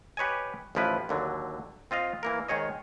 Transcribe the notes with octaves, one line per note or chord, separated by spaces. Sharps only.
G4 B4 C#5 D#5 G#5
A1 D#3 F3 E4 B4
D#2 D3 F#3
C4 F4 D#5 F5
E3 A#3 A#4
G#2 D#3 G#4 C#5 D#5